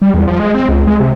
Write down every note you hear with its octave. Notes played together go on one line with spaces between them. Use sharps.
G3
E2
F3
G#3
C4
C#2
G#3
C3